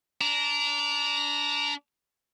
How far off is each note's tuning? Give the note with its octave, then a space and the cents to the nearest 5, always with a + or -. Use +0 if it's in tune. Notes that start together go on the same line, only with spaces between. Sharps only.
D4 -25 A#5 +0